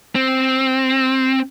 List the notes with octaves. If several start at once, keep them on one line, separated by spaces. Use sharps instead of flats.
C4